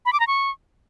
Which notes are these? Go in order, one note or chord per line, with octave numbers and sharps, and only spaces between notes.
B5
D6
A#5
C#6